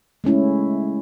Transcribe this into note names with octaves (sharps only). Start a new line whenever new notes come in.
G#3 A3 C#4 E4